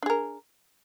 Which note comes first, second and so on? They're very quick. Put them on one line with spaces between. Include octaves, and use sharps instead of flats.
D4 G#4 A#4